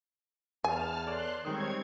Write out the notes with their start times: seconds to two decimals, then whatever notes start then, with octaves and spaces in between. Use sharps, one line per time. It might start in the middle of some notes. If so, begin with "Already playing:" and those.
0.64 E2 G#5 A5 F6
1.06 A4 C#5 D5 C6 F#6
1.45 D#3 G3 G#3 C4 C#5 D#6 G#6